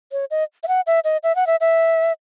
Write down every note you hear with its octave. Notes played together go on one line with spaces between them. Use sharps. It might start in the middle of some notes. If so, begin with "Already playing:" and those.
C#5
D#5
E5
F#5
E5
D#5
E5
F#5
E5
E5